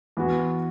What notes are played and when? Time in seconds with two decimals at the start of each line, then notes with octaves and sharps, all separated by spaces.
0.17 E3 B3 F#4